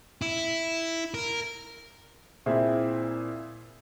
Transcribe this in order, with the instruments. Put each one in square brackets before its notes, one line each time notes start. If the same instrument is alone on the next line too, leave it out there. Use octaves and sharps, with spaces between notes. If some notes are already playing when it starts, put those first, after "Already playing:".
[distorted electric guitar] E4
A#4
[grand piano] A#2 C4 E4 G#4 E5